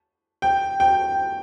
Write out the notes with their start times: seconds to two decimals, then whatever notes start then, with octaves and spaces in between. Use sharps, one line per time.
0.42 G5
0.80 G5